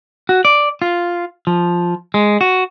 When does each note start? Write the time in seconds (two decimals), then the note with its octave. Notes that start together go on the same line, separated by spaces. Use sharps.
0.29 F#4
0.45 D5
0.82 F4
1.47 F3
2.14 G#3
2.41 F#4